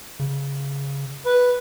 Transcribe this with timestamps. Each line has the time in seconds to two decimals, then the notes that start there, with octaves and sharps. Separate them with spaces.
0.20 C#3
1.26 B4